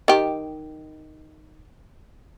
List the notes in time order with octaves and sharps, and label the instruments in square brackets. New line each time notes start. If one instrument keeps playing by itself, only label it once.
[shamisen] D#3 G4